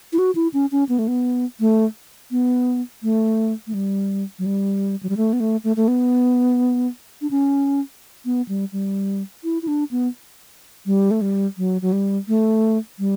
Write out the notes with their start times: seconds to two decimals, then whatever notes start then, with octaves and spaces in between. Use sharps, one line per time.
0.13 E4
0.19 F#4
0.35 E4
0.54 C#4
0.72 C#4
0.89 B3
0.99 A3
1.08 B3
1.60 A3
2.31 B3
3.03 A3
3.67 A3
3.74 G3
4.39 F#3
4.46 G3
5.03 F#3
5.09 G3
5.17 A3
5.33 B3
5.40 A3
5.64 A3
5.76 A3
5.88 B3
7.21 D4
7.31 C#4
8.25 B3
8.48 G3
8.72 G3
9.44 E4
9.62 E4
9.68 D4
9.91 B3
10.86 G3
11.11 A3
11.21 G3
11.58 F#3
11.82 F#3
11.92 G3
12.28 A3
12.99 G3